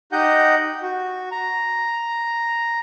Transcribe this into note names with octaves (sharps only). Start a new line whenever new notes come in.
D#4 G4 D#5 F#5 G6
F#4
A#5